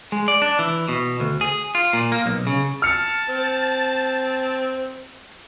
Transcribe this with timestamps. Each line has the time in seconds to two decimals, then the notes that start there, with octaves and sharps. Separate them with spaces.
0.12 G#3
0.28 D5
0.42 D4
0.59 E3
0.89 B2
1.20 D2
1.41 G#4
1.75 F4
1.93 A#2
2.12 A#3
2.26 B1
2.47 C#3
2.82 A5 F6 C#7
3.29 C4